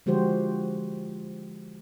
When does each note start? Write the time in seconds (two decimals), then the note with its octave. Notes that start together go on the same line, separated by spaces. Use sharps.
0.06 D3 F3 G#3 F#4 G4 C5